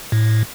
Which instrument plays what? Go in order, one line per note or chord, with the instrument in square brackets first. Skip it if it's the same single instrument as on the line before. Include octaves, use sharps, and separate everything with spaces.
[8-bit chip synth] A2